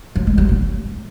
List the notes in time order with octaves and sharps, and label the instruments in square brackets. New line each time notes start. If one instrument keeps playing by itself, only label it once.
[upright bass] F#3
G#3
F#3
A#2